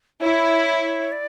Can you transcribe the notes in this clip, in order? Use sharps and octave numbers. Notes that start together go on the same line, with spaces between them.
E4 C#5
D5